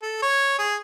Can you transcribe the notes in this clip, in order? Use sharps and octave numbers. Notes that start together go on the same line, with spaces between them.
A4
C#5
G#4